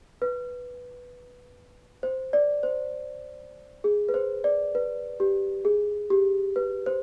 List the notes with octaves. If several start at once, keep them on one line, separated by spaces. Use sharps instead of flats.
B4
C5
D5
C5
G#4
B4
C5
D5
B4
G4
G#4
G4
B4
C5